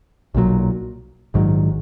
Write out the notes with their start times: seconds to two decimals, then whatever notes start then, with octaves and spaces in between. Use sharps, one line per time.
0.35 B1 A#2 F#3
1.34 A#1 G#2 D#3 F#3